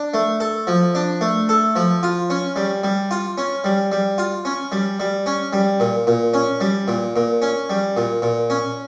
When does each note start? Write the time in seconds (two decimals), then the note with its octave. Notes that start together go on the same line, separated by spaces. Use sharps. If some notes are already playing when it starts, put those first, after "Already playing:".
Already playing: D4
0.14 A3
0.40 A4
0.67 F3
0.95 D4
1.21 A3
1.49 A4
1.76 F3
2.03 F4
2.30 C#4
2.56 G3
2.84 G3
3.11 F4
3.38 C#4
3.64 G3
3.92 G3
4.18 F4
4.45 C#4
4.72 G3
5.00 G3
5.26 C#4
5.53 G3
5.80 A#2
6.07 A#2
6.34 C#4
6.60 G3
6.88 A#2
7.16 A#2
7.42 C#4
7.70 G3
7.97 A#2
8.22 A#2
8.50 C#4